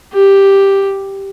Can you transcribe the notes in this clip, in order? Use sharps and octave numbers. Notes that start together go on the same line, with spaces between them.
G4